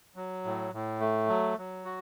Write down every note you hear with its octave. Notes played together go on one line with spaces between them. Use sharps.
F#3
A2
A2
A3
F#3
F#3
F#4